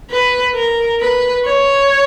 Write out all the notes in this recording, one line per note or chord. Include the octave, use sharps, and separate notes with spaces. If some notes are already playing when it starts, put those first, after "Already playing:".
B4
A#4
B4
C#5